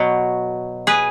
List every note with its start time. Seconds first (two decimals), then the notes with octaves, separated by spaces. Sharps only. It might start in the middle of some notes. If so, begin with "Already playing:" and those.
Already playing: B2 F#3
0.87 G#4 B4